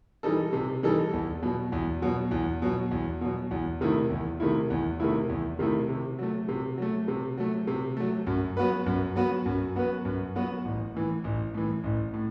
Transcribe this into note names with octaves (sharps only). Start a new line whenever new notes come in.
E3 G3 D#4 A4
C3
E3 G3 D#4 A4
E2
B2 F#3
E2
B2 F#3
E2
B2 F#3
E2
B2 F#3
E2
C3 D#3 A3 E4
E2
C3 D#3 A3 E4
E2
C3 D#3 A3 E4
E2
C3 D#3 A3 E4
C3
F#3 A3
C3
F#3 A3
C3
F#3 A3
C3
F#3 A3
F#2
F#3 B3 F#4 B4
F#2
F#3 B3 F#4 B4
F#2
F#3 B3 F#4 B4
F#2
F#3 B3 F#4 B4
A1
A2 E3
A1
A2 E3
A1
A2